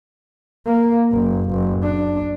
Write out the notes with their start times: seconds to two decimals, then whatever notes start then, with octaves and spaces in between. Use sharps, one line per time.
0.67 A#3
1.12 F#1
1.50 F#1
1.83 D4